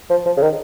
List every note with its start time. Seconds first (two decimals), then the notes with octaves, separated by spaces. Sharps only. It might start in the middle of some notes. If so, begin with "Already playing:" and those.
0.10 F3
0.26 F3
0.37 C#3
0.42 D#3